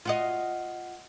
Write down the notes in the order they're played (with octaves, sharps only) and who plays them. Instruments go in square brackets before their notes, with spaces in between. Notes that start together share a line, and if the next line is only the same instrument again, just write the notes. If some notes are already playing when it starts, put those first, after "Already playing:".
[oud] F4 F#4 D#5